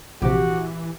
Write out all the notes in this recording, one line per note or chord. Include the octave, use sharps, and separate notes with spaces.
A#1 C3 E3 F#4 G4